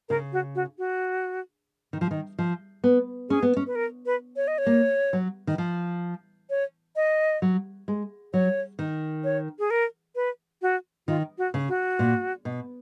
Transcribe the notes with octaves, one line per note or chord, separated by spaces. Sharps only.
C#3 A#4
F#4
F#4
F#4
D#3
F3
D#3
F3
B3
C#4 G#4
B3
C#4
B4
A#4
B4
C#5
D#5
C#5
A#3
F#3
D#3
F3
C#5
D#5
F#3
G#3
F#3 C#5
D#3
C#5
G#4
A#4
B4
F#4
D#3 F4
F#4
C#3
F#4
A#2
B2